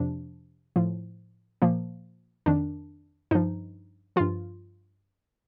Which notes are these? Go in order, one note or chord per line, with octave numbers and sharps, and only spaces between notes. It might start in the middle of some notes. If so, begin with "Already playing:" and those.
Already playing: F2 C3 F3 D4
A2 F3
A#2 F3 A#3
F2 D#3 D4
G2 F3 D#4
G2 F3 F4